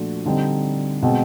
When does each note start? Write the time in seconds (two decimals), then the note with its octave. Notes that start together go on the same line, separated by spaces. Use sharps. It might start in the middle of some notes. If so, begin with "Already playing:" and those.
Already playing: A#2 F3 A3 D4 F#4
0.26 D3 G3 C4 D#4
1.02 B2 G#3 C4